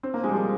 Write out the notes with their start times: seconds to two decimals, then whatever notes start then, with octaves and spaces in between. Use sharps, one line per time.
0.03 C4
0.14 A#3
0.24 G#3
0.29 G3
0.33 F3